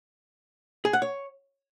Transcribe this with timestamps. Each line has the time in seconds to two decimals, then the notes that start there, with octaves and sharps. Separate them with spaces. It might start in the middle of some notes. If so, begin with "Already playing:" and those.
0.85 G#4
0.93 F#5
1.02 C#5